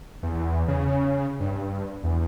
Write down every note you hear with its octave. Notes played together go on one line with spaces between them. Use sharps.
E2
C#3
G2
E2